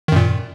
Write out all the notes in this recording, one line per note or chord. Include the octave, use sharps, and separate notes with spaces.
F#2 A#2 D#3